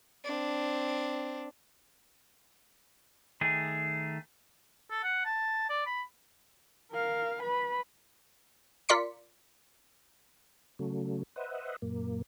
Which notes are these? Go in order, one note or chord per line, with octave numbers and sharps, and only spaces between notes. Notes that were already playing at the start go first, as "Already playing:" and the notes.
C4 D4
D#3 A3 G#4
A4
F#5
A5
D5
B5
A#4 F5
B4 B5
F4 A#4 D5 C6 B6 C#7
C#3 F#3 A3
B4 C5 D#5 E5 F#5
F#2 A#2 A#3